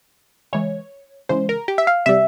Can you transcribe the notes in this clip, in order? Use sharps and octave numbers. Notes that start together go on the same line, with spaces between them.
C#3 E3 G#3 C#5
C#3 E3 G#3 C5
A#4
G4
E5
F5
C3 G3 E5